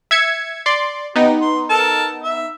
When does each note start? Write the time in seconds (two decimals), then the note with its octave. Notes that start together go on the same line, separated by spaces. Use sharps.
0.11 E5 G#6 C#7
0.66 D5 C6
1.15 B3 D#4 G4
1.41 C6
1.70 A4 A#4 A5
2.23 E5